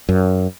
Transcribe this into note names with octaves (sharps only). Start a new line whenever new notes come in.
F#2